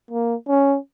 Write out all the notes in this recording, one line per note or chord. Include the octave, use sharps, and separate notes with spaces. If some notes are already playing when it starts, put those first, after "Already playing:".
A#3
C#4